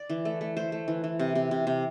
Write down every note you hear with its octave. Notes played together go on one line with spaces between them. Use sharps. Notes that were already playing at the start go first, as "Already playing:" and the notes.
Already playing: D5
E3
A3
A3
A3 C5
A3
E3
E3
C3
C3
C3
C3